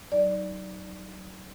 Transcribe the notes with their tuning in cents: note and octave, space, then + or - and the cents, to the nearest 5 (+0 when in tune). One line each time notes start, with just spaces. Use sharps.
F#3 +35 D#4 +0 D5 +0